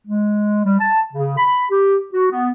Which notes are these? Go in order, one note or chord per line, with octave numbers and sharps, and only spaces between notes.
G#3
G3
A5
C#3
B5
G4
F#4
B3